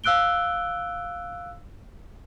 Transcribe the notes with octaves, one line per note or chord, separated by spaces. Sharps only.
F5 E6 F#6 D7 G7